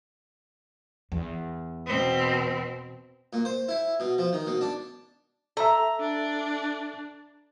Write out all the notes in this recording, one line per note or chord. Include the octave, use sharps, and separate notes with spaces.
E2
B2 C4
A#2
C5
E4
B2
F3
D#3
B2
D4
A4 E5 A#5
D4